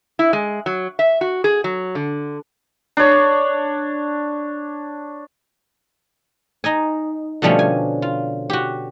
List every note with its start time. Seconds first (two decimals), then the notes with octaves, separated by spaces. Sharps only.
0.19 E4
0.33 G#3
0.66 F#3
0.99 E5
1.21 F#4
1.44 G#4
1.64 F#3
1.95 D3
2.97 D4 C#5
6.64 D#4 D#5 G#5
7.42 B2 D3 F3 G3 A3 C#4
7.59 G#5
8.02 F4
8.50 F#4 G4